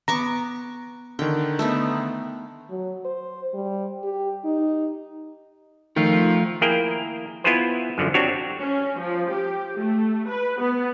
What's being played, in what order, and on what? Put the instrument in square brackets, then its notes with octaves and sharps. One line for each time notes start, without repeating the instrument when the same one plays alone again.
[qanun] B3 C#6 D6 [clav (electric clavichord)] A#5
[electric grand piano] D3 D#3 [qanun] G5
[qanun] A3 B3 D#4
[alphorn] F#3
C5
G3
G4
D#4
[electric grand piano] D#3 [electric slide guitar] F3 A3 F4
[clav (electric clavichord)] A#3 E4 G#4 A#4 G5
B3 E4 F4 G#4 B4 C5
F#2 D3 F3
C4 D4 F#4 G4 C#5
[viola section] C#4
F3
G4
A3
B4
B3